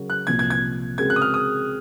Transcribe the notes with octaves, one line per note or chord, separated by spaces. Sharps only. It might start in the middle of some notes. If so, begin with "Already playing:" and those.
Already playing: C#3 F#3 C#4 F#4 A#4
F#6
C2 A#2 F3 G#6
G#6
G#6
C#3 G#3 C4 F#4 A#4 G#6
F#6
D#6
F6
D#6